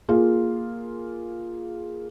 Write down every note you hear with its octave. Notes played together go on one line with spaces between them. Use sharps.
A#3 F4 G#4